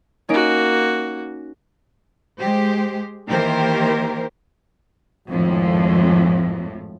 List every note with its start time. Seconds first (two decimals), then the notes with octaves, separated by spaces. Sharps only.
0.29 A#3 C#4 D#4 F#4 D7
2.39 G#3 G4 C5
3.27 D#3 E3 A#3 G4 A#4 C5
5.28 G#1 F2 A2 F3